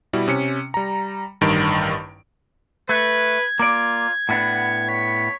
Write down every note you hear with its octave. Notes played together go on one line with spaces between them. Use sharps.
B2 G3 E4
C3 C#4 C#7
G3 A#5
A1 G2 D#3 D7
A3 B4 G#6
A#3 F4 D5
A2 B3 D4 F#5
C#5 B6